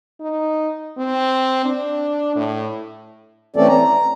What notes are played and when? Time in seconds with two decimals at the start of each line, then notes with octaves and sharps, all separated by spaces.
0.21 D#4
0.98 C4
1.65 D4
2.36 A2
3.56 E3 A3 C4 C#4 A4 D5
3.68 A#5